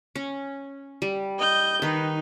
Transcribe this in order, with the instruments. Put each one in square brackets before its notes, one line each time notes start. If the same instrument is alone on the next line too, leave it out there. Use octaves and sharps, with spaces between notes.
[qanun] C#4
G3
[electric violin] D#5 G6
[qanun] D#3 B4 [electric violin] D#4